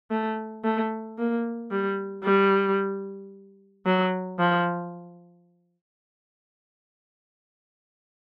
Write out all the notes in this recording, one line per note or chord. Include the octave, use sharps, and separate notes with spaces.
A3
A3
A#3
G3
G3
F#3
F3